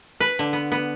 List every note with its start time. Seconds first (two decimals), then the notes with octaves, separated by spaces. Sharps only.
0.20 B4
0.39 D3
0.53 B3
0.72 B3